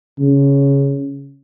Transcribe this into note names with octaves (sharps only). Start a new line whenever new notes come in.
C#3